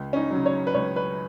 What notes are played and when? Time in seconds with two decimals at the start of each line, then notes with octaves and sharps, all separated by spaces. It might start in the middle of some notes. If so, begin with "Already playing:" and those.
Already playing: C#2
0.13 C#4
0.16 D#4
0.31 C#3 F#3
0.46 C#5
0.67 B4
0.74 C#2 C#5
0.96 B4